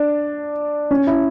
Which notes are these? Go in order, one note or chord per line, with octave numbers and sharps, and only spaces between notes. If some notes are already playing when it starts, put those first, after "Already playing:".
Already playing: D4
C#4
E4